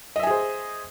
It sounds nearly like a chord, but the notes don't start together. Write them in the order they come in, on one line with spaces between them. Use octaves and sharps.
D#5 E5 G#5 G#4 C5